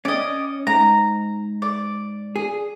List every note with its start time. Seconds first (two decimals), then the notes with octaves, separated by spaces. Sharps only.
0.05 C#4 D5 D#5
0.67 G#2 A#5
1.62 D5
2.36 G#4